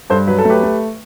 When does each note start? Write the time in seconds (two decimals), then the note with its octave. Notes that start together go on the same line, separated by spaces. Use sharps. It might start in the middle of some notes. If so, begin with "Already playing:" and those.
0.10 G2 A4 C5
0.27 F#3 B4
0.39 A4
0.45 A3 G4 B4
0.63 A3